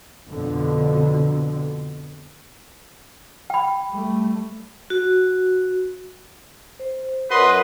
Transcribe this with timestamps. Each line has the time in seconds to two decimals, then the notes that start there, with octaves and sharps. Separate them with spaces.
0.29 F2 B2 D3
3.50 G5 B5
3.91 G3 A3
4.90 F#4
6.79 C5
7.31 F#2 B4 D#5 F#5 C6